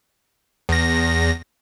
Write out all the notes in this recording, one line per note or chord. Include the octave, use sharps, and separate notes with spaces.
E2 A#6